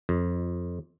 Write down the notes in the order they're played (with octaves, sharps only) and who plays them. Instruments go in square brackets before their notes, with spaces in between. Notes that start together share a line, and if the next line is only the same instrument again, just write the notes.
[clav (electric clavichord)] F2